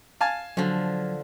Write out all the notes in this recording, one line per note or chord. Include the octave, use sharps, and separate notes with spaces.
F5 G#5 A5
D3 F3 F#3